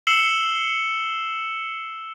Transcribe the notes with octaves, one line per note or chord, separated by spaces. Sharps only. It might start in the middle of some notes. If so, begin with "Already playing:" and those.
E6 C7 C#7 E7 F#7 G7